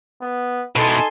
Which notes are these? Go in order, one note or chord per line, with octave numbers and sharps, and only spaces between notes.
B3
B2 D#4 E4 A4 G#5 C6